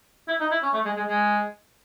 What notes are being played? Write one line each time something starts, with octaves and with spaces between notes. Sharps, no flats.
E4
D#4
E4
C#4
A3
G#3
G#3
G#3